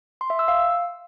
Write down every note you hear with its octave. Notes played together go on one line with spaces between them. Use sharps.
C6
E5
E6
F5